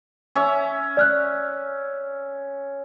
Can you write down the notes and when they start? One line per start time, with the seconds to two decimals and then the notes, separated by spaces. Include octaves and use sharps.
0.35 C#4 E5
0.97 D5 F6 F#6